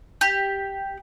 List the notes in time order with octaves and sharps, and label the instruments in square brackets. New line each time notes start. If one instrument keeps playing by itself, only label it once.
[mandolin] G4